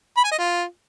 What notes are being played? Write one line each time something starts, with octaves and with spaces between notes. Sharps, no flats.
B5
G#5
D#5
F4